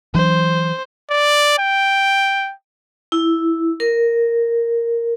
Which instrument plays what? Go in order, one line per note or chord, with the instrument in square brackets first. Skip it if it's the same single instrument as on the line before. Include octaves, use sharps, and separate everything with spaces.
[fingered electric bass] E3 F#3 D4 [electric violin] C5
[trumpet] D5
G5
[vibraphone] E4
A#4